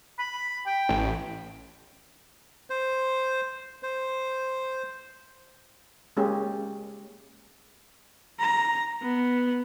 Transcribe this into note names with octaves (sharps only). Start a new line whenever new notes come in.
B5
G5
A1
C5
C5
G#3 A#3 C#4 G4 G#4
A#5
B3